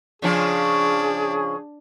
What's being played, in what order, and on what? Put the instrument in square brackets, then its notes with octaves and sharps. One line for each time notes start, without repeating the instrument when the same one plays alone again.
[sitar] C#3 F3 C#4 [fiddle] D4 [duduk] G#4